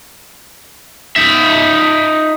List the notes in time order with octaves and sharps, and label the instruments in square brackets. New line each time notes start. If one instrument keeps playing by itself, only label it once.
[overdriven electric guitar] D#4 E5